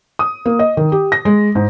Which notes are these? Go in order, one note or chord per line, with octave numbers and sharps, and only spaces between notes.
D#6
A#3
D#5
D#3
G4
A#6
G#3
G#2